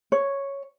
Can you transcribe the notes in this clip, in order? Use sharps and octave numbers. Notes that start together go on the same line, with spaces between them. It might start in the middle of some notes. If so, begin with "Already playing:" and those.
C#5